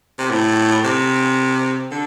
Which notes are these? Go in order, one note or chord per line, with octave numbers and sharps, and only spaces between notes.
C3
A2
C3
D3